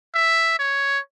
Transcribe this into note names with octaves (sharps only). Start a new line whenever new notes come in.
E5
C#5